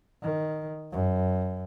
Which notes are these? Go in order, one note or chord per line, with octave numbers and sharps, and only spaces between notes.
D#3
F#2